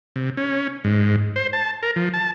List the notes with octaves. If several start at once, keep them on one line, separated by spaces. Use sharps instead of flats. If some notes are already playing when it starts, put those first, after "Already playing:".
C3
C#4
G#2
C5
A5
A#4
F3
A5